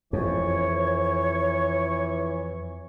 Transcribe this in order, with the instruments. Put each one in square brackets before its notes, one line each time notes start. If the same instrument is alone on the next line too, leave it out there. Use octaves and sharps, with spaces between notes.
[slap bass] F2 [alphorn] E3 [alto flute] C#5 [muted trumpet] C#6